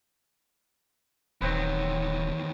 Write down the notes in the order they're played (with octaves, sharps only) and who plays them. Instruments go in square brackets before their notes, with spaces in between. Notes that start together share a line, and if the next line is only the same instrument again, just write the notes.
[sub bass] D#1 [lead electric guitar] E2 D#3 [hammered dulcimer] F#3 C4 B4